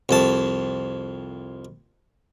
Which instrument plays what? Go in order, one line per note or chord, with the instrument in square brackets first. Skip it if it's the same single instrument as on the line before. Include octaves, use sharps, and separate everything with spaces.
[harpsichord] C2 F2 A5